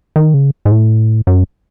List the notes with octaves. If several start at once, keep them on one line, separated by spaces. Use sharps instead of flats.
D#3
C#3
G#2
A2
F#2